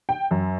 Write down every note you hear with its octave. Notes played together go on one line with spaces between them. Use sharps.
G5
F#2